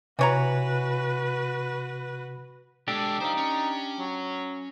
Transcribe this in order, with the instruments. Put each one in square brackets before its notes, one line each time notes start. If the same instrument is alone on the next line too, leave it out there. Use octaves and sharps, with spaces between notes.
[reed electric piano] C3 [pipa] E3 C#5 A#5 [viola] F#4 B4
[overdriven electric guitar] B2 G#3 [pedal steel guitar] D4 G4 [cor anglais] A4
[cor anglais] D#4 [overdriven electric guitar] C5 F5
[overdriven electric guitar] C#4
[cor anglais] F#3